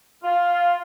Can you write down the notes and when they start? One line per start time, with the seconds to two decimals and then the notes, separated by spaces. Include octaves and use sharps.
0.24 F4